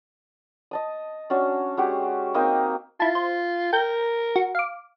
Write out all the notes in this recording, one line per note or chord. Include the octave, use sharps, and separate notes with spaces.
D#5 A5 D#6
C#4 D4 F#4 C#5
G#3 F#4 G4
A#3 C4 D#4 D#5
E4 F4 A5
C5
A#4 G5 G6
F#4
F5 D6